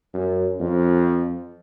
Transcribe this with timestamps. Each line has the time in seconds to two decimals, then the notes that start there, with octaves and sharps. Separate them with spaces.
0.14 F#2
0.60 F2